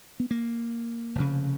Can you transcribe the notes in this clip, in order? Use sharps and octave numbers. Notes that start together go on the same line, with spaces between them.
B3
A#3
F1 F2 C#3